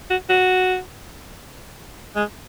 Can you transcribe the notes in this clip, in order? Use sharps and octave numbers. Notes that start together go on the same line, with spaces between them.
F#4
F#4
G#3